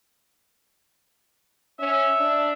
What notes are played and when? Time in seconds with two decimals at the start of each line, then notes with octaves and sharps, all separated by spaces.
1.79 C#4 E5
2.20 D4